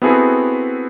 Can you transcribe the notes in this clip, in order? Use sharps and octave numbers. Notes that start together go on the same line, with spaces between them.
B3 C4 E4 F#4 G#4 A4